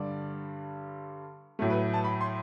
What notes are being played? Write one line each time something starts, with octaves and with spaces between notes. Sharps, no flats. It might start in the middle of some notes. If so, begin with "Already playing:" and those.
Already playing: G2 D3 G3 D5
A2 F#3 A3
B4
A5
B5
C6